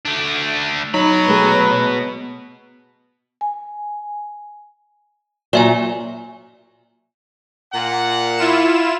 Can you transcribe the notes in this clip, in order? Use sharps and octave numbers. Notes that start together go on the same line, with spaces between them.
A3 D4
B2 F#3 D#4 B5
G#3 A3 G#4 B4
G#5
A#2 F#3 D5 E5 G#5
A#2 F#5
E4 F4 E7